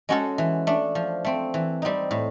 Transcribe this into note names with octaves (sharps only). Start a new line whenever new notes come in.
G#3 C#4 F#4 A4
E3
A3 D4
F3
A3 C4
E3
G3 C4 D#4
A2